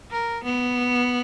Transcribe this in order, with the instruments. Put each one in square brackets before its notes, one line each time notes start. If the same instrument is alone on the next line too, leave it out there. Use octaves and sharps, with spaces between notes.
[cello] A#4
B3